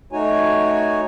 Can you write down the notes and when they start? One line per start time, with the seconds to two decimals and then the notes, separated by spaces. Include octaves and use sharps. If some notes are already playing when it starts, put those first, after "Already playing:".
0.12 A3 D#4 F#4 C#5 G#5